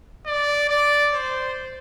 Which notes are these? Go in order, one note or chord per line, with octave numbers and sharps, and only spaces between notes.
D5
D5
C5